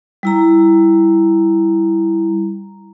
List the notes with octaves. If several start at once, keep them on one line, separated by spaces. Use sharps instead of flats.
G3 E4 A#5